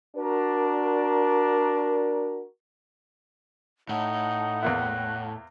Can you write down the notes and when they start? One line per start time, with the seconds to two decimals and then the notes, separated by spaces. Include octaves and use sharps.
0.17 D4 F#4 A#4
3.89 A2 D#4 F#5
4.63 E2 A#3 E4 F#6